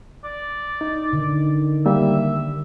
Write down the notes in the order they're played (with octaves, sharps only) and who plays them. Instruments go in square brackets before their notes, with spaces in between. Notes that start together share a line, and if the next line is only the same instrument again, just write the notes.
[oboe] D5
[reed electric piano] D#4
[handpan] D3 [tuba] D#3
[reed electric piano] G3 A#3 [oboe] E5